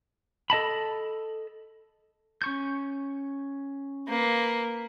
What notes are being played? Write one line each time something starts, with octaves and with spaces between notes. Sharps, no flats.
A4 D#5 A5 B5
C#4 C#6 G6
A#3 B4